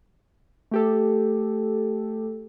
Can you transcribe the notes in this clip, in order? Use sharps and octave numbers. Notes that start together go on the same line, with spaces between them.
A3 G4 A4